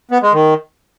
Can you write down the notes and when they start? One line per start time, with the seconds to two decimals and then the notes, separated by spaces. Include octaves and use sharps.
0.11 B3
0.22 G#3
0.33 D#3